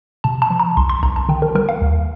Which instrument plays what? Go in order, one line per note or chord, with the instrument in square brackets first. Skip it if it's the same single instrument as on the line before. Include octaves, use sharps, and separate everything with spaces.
[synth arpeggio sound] C3 A5
A5
F3
A#5
C2 C6
C6
C2 A#5
A5
D#3 G5
A#4
G3 A#4
F5
D#2